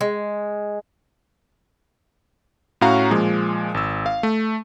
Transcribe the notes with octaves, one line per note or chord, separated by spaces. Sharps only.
G#3
A2 C#4 F#4 F5 A#5
A#2 F3 G#3
G#1 E6
F5
A3